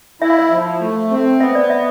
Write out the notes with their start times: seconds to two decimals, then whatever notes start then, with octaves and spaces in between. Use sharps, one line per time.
0.22 E4 E5
0.30 F5
0.39 E5
0.51 F3
0.81 A3
1.11 C4
1.40 B3 E5
1.55 D5
1.70 E5